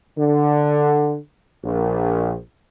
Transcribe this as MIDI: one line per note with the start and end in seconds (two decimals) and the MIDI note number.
0.18 1.16 50
1.64 2.34 34